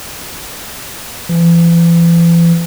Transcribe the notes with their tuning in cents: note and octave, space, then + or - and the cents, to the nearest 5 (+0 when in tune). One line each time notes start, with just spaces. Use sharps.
E3 +40